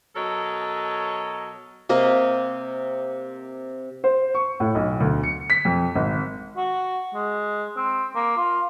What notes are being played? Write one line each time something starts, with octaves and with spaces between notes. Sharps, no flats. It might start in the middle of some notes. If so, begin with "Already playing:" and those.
B2 F#3 A4 A#4 C#5 D#5
C3 A#3 D#5
C5
C#6
A2
B1
D2
C#7
B6
F2
G#1
F#4
G#3
C4
A#3
F4